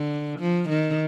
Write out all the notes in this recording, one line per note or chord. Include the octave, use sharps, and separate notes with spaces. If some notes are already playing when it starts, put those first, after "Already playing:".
Already playing: D3
F3
D#3